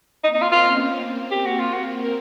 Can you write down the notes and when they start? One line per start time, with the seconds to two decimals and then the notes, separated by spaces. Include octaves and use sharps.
0.24 A#3 C4 D#4
0.34 D#4
0.42 F4
0.52 F4
0.60 B3 C#4
0.96 A#3 C4
1.31 G4
1.46 F#4
1.60 F4
1.74 F#4
2.03 A#4